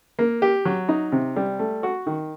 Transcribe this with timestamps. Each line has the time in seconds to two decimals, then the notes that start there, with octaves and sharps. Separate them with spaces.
0.19 A#3
0.42 G4
0.65 F#3
0.89 D#4
1.12 C3
1.36 G3
1.59 A3
1.83 F#4
2.06 D#3